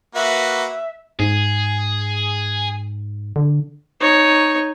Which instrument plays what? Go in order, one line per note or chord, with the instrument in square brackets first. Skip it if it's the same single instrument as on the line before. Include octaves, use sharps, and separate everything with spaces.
[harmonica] A#3 F#4 B4 [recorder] E5
[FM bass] G#2 [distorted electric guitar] G#4
[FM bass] D3
[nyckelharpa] D#4 C#5